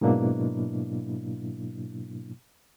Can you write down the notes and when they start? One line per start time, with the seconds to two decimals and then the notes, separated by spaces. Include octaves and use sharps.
0.01 G#2 B2 F#3 A#3 D4 E4